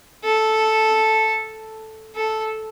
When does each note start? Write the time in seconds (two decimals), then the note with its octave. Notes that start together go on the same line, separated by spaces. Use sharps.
0.24 A4
2.15 A4